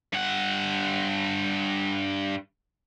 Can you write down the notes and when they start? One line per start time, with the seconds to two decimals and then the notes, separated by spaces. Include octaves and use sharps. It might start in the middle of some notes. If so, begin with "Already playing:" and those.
0.13 G2 F#5